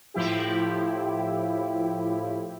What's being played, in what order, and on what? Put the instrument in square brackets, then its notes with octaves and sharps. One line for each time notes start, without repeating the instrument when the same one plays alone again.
[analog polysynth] A2 F3 E4 G4